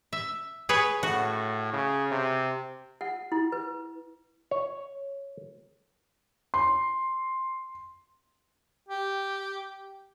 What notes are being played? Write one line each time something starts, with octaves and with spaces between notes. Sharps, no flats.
E5
G#4 B4 C#5
A2 F#4
C#3
C3
F#5
E4
B4
C#5
C6
G4